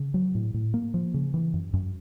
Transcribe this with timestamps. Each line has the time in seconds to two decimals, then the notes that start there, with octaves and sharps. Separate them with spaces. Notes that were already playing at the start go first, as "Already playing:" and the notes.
Already playing: C#3
0.14 F#3
0.35 A2
0.54 A2
0.74 A#3
0.94 F3
1.14 C#3
1.34 E3
1.54 F#2
1.73 F#2